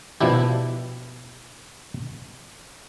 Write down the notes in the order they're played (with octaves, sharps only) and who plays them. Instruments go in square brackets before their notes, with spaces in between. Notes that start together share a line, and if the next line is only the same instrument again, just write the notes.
[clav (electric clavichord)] B2 F3 D4 E4 G4